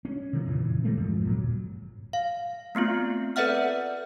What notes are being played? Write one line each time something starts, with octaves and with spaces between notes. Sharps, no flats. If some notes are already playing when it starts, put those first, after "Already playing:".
C#4
C3 D#3 F3
F2 A#2 C#3 E3
E3 G3 A3 C4
D#2 G#2 F3
G1 A#2 F#3
F5
A3 B3 C4 F4
A4 B4 D5 E5 F#5 F6